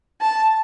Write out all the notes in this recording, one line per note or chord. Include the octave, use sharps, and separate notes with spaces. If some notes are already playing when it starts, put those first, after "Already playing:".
A5